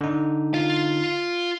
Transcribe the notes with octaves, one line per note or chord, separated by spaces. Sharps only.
D3 D#4
F4 F5